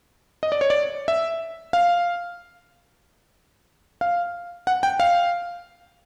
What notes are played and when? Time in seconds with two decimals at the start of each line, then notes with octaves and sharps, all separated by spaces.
0.43 D#5
0.52 D5
0.61 C#5
0.70 D5
1.08 E5
1.73 F5
4.01 F5
4.67 F#5
4.83 G5
5.00 F5